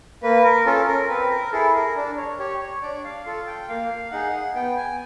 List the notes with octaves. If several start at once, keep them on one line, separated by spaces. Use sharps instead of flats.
A#3 B4
A#4
C#4 F4 A4
A#4
C4 B4
A#4
E4 G#4 A4
A#4
D4
C#5
G4 C#5
C#5
D4 D5
F5
F4 A4
G5
A#3 F5
D#4 G#4 F#5
B3 G5
G#5